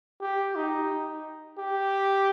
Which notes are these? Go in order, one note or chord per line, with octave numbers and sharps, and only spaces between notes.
G4
D#4
G4